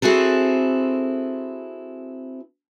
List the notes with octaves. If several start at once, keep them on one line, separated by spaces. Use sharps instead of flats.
C4 E4 F#4 G#4 A4